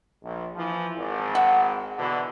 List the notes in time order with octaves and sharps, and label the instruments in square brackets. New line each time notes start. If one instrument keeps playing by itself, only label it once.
[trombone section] A#1
E3 F3
G#1
[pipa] E5 F#5
[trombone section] B2 D3 E3